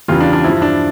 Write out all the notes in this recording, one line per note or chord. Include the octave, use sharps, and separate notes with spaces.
E2 C#3 E3 G3 F4
D4
D4
G2 F3 E4
D4